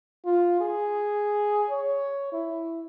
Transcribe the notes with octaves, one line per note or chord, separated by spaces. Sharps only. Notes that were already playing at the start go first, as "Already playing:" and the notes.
F4
G#4
C#5
E4